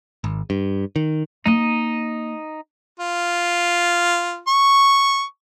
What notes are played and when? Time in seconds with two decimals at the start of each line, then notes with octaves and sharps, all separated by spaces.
0.24 G#1
0.50 G2
0.96 D#3
1.46 A#3 C4 D#4 D#5
3.00 F4
4.48 C#6